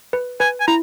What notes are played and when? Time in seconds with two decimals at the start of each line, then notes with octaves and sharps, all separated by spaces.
0.13 B4
0.40 B4 G#5
0.61 G#5
0.67 E4 A#5